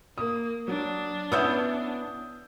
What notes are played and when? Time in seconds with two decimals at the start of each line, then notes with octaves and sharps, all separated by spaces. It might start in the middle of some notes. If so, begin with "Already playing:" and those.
0.18 A#3 D#6
0.68 F#3 D4
1.32 B3 C#4 E4 D#6 E6 G6